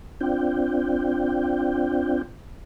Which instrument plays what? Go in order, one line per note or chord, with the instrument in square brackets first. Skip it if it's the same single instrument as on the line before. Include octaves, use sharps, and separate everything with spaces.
[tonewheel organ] C4 D4 F4 G5